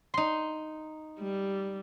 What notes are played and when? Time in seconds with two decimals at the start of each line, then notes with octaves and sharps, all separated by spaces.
0.14 D#4 C6
1.20 G3